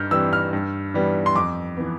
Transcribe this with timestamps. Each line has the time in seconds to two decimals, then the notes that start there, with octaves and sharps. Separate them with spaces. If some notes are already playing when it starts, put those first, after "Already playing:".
Already playing: G2 F6 G6
0.11 E3 G3 C4 E6
0.33 F6
0.53 G2
0.94 E3 G3 B3
1.26 C6
1.35 F2 D6
1.77 E3 B3